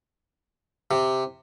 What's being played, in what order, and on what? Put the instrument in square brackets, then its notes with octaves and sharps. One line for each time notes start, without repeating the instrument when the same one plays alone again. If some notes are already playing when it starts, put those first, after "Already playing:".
[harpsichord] C3